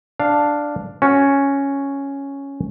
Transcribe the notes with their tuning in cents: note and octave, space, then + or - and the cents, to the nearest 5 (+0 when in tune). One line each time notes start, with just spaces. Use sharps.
D4 +0 F5 +0
C#4 +0 F#4 -5